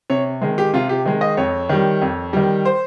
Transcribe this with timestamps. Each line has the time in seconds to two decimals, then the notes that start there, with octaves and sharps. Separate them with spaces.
0.10 C3 C#5
0.41 D#3 G#3
0.58 G4
0.74 C3 F4
0.89 G4
1.06 D#3 G#3
1.21 D#5
1.37 F2 C#5
1.69 D#3 G3
2.02 F2
2.33 D#3 G3
2.65 C5